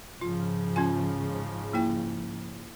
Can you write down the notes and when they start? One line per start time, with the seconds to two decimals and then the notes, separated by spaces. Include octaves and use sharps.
0.21 G#2 C#3 F3 F4
0.76 C#4 F4 G#5
1.73 A#3 E4 G5